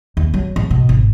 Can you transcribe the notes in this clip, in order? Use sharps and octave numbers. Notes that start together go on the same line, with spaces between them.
D#2
F#3
A1
B2
G#1